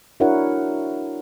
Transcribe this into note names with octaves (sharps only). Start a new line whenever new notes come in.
D4 E4 F#4 A#4 C#5 F#5